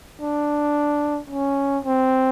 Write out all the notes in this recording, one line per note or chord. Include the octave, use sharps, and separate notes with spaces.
D4
C#4
C4